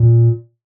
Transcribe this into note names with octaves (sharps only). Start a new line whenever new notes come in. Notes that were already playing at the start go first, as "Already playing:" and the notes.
Already playing: A#2